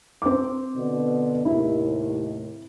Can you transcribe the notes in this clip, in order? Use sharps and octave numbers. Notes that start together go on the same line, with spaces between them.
C4 D6
B2 D3
D#2 A2 C3 E4